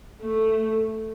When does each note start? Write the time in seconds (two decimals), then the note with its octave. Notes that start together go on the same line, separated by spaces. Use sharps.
0.22 A3